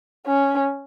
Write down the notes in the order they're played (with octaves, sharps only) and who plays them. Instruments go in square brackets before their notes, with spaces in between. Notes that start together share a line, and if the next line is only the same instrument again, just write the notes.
[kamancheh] C#4